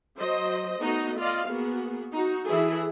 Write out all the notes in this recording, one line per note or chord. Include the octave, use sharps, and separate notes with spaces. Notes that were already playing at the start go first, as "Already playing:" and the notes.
F#3 C5 D#5
A3 B3 D#4 F#4 D#5
F4 D5 D#5 F5
A#3 B3 F#4 G#4
D#4 F#4
E3 E4 G#4 A4